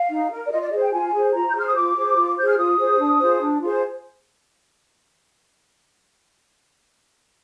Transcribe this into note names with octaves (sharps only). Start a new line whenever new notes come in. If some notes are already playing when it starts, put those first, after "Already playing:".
Already playing: F5
D#4
A#4
D5
F4 D#5
D5
G#4 C5 D#5
G5
F4 G#5
G#4 C5
F4 A#5
G6
G#4 C5 F6
D#6
F4 D6
G#4 C5
F4
G#4 C5 G6
F6
F4 D#6
G#4 C5
D4
F4 G#4 C5
D4
F4 G#4 C5